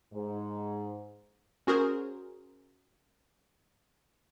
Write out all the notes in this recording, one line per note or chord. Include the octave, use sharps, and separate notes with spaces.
G#2
C#4 F#4 G#4 A#4 C5